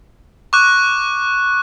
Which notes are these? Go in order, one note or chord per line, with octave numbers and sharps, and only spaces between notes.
C#6 D6 F#6